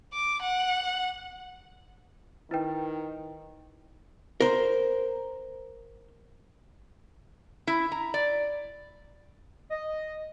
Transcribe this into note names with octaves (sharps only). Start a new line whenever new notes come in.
D6
F#5
D#3 E4 B4 G5
A#4 C5
E4
A#5
D5
D#5